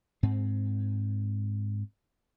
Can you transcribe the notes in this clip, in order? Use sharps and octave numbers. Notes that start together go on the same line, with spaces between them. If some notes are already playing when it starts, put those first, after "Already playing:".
G#2 C4